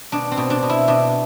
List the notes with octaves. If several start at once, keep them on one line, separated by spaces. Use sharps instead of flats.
B2 D4
C4
B2
D4
B2
E4
B2 D4